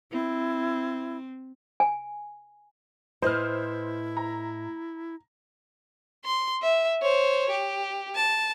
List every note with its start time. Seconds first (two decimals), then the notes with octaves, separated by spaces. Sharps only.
0.12 C4 E4
1.80 G#5
3.22 A2 E4 B4 C5 D#5 F6
4.17 A#5
6.25 C6
6.62 E5
7.02 C5 C#5
7.50 G4
8.16 A5